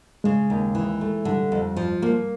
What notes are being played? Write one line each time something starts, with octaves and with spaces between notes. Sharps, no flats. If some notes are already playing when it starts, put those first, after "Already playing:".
C#3 G#3
D#2
E3
A3
D3 G3
F2
F3
A#3